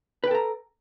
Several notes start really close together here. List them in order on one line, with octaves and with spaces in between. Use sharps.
B4 G5 A4 A#5